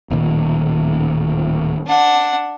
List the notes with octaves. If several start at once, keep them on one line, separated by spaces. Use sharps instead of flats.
D1 A#2 D#3
D4 F#5